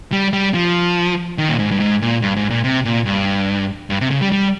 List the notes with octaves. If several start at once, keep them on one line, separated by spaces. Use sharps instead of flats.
G3
G3
F3
D#3
A#2
G#2
G2
G#2
A#2
G2
G#2
A#2
C3
A#2
G2
G2
C3
C#3
G3
G3